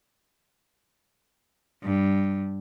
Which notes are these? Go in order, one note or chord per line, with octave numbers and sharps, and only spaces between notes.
G2